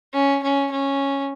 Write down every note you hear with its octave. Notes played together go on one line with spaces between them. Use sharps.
C#4
C#4
C#4